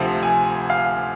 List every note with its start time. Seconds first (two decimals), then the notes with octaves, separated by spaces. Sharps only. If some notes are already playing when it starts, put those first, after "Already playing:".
Already playing: D2 C3 F3
0.23 G#5
0.70 F5